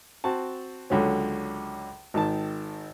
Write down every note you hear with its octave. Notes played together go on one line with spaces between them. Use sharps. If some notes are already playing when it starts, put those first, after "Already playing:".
C4 F#4 A5
C#2 D3 F#3 C#4
G#1 D#3 A5